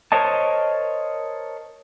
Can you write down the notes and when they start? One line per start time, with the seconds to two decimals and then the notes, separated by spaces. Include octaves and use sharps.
0.12 A#4 C5 C#5 D#5 A5